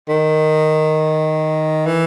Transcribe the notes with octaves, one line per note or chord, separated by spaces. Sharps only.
D#3
E3